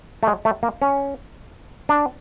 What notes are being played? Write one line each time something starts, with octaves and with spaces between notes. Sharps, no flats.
A3
G#3
A3
A#3
C#4
D4